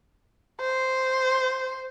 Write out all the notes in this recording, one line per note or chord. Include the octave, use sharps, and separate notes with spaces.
C5